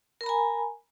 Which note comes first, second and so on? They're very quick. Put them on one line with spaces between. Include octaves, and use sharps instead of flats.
A#4 B5 A#5 G#5